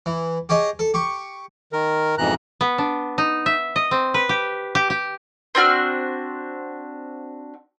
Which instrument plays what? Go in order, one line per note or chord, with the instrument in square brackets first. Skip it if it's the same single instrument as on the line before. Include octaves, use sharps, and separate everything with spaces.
[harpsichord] E3
G4 G#4 C#5 D#5
A4
G4 C#6
[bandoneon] D#3 A#4
F2 G#2 B2 E3 A#5 F#6
[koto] B3
D4
D#4
E5
D#5
C4
B4
G4
G4
G4
[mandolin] C4 D4 F#4 F6